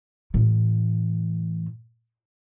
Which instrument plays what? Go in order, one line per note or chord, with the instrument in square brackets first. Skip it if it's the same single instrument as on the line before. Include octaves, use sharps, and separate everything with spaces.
[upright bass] A2 E3